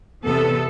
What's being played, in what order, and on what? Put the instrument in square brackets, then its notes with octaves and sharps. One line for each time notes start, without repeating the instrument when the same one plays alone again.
[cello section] E2 C3 E3 B3 A4